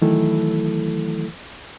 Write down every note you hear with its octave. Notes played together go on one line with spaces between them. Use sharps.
D#3 E3 F#3 A3 E4 A4